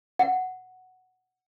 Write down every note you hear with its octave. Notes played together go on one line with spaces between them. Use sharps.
F#5